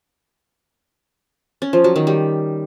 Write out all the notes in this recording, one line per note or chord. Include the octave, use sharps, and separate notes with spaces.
C#4
F3
F#3
D#3
G3